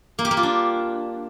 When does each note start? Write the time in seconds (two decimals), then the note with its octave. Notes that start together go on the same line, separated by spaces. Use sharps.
0.19 A#3
0.25 G4
0.31 A#3
0.37 F4
0.43 D4